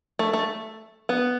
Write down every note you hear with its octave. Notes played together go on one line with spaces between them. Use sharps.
A3
A3
B3